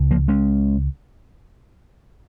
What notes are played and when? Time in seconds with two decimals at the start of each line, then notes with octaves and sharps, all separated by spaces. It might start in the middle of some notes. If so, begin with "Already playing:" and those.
Already playing: C#2 C#3
0.11 F3 A#3
0.28 G#3 C#4